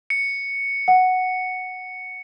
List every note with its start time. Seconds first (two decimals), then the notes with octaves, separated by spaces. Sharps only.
0.10 C#7
0.88 F#5